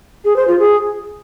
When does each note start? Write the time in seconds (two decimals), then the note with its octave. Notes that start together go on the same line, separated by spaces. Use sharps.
0.25 G#4
0.36 C5
0.48 F4
0.59 G#4